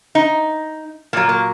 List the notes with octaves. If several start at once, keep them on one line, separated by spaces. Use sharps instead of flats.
D#4
A#2 F#3 A#3
A#3